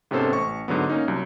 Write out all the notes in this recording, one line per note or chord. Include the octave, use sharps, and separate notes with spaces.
G#2 C3 B3 C#4 A4 C5
A1 C#6
G#2 D3 F#3 B3
A#3 C#4 D#4
C2 F#3